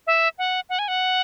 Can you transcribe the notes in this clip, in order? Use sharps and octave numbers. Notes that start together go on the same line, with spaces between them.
E5
F#5
F#5
G#5
F#5